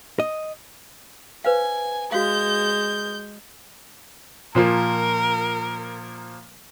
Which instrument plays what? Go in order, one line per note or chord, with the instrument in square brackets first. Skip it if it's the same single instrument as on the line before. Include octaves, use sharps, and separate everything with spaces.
[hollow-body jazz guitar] D#5
[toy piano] B4 C5 F5 [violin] G#5
[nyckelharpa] G#3 [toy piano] F#4 F5 [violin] G6
[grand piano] A#2 F3 A#3 [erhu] A#4